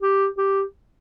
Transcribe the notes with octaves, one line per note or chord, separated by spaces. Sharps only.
G4
G4